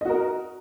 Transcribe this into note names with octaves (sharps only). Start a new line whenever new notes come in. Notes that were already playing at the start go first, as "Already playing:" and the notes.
F#4 A#4 D#5